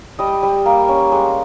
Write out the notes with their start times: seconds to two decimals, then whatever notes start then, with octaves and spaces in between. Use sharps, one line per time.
0.19 G3 D#5
0.43 G3
0.66 A#3
0.89 C#4
1.12 G#3